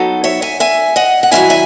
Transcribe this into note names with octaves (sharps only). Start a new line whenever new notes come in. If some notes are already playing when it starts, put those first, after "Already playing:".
Already playing: F#3 B3 D#4 A4
C#5 E5
E5 G#5
E5 G#5
D#5 F#5
F#5
D#3 F#3 A3 C#4 E4 E5 G#5
E5 G#5